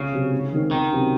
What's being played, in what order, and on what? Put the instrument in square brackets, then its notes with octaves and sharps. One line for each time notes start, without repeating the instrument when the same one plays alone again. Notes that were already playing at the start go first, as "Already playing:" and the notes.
Already playing: [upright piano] C#2 [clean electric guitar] C#3
[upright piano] C3 F#3
G#2
D#3 G#3 C4
[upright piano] C#2 [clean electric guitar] D#3
[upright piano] C3 F#3 C#4